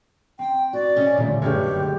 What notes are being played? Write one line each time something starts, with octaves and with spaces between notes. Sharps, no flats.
C4 G5
F#4 D5
C#3 C#4 D#5
A#2 D3 G3 A3
F#1 G2 D3 G#3 G4 C#5 F6